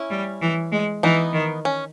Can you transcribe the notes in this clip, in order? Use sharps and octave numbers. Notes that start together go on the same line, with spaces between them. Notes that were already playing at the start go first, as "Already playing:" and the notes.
Already playing: C#4 E4
G3
E3
G#3
E3 B3 D#4
D#3
C#4